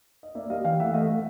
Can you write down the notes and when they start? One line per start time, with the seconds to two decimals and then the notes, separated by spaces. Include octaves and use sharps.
0.23 D#5
0.35 A#3 D5 E5
0.50 G3 D#5 F5
0.64 E3 F5 G5
0.80 A3 E5 F#5
0.94 A3 D#5 F5
1.09 A3